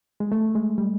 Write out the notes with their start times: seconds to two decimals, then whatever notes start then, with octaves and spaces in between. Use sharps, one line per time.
0.20 G#3
0.32 A3
0.55 G#3
0.78 G3